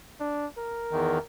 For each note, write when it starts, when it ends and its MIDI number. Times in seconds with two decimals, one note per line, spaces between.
0.20 0.46 62
0.57 1.24 70
0.91 1.19 40
0.91 1.19 51